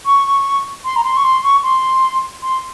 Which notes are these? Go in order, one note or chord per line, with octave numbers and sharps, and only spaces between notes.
C#6
C6
A#5
C6
C#6
C6
C#6
C6
C6